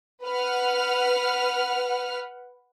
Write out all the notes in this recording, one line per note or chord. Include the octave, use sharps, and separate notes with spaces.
B4 F#5 F6